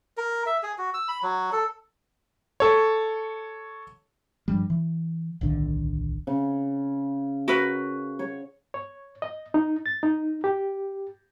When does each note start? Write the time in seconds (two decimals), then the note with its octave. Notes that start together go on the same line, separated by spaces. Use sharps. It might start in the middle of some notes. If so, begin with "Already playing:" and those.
0.17 A#4
0.46 E5
0.63 G#4
0.78 F#4
0.94 E6
1.08 B5
1.23 F#3
1.52 A4
2.60 A4 C#5
4.48 G2 F3 G3
4.70 E3
5.41 D1 B1 D3 D#3
6.27 C#3
7.48 F#4 A#4 B4
8.19 C#5 C#6
8.74 C#5
9.22 D#5
9.54 D#4
9.86 A6
10.03 D#4
10.44 G4